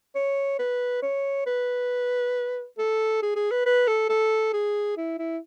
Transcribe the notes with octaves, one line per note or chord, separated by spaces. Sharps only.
C#5
B4
C#5
B4
A4
G#4
G#4
B4
B4
A4
A4
G#4
E4
E4